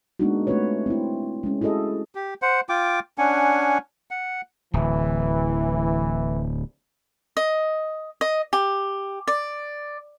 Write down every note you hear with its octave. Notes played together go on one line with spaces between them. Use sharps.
G#3 A#3 B3 D4 D#4 F#4
A3 C4 F4 F#4 B4 C#5
C4 E4
G#3 C#4
E4 F#4 G#4 A4 D#5
G4
C5 F#5
F4 G5 D6
C#4 D4 F#5 G#5
F#5
D1 E3
D#5
D#5
G4
D5